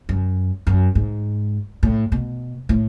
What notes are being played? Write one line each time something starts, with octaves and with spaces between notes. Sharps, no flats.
F#2
F#2
G#2
A2
B2
A2